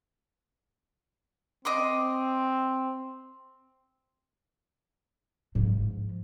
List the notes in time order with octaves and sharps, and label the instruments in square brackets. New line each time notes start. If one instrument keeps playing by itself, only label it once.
[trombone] C4 [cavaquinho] D#5 C6 D6
[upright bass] G#2 F3